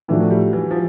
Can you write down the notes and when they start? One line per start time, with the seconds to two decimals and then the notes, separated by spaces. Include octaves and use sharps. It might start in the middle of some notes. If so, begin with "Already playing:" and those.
0.08 A2 E3 F3 A3 D4 F#4
0.20 F#3
0.30 G3
0.53 E3
0.71 F3